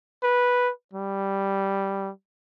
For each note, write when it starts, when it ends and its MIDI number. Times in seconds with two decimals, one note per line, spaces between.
0.23 0.71 71
0.93 2.10 55